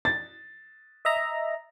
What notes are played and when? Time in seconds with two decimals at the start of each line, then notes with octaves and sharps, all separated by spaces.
0.05 A6
1.05 D#5 E5 A#5